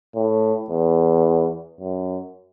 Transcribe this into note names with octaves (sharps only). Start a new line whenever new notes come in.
A2
E2
F#2